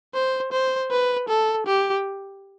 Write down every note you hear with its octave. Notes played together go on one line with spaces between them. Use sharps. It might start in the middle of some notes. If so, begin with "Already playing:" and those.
C5
C5
B4
A4
G4